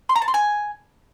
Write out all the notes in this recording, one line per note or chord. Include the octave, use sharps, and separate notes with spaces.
C6
A#5
A5
C6
G#5